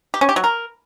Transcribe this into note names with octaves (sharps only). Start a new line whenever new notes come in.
G4
C#4
G4
F#3
A#4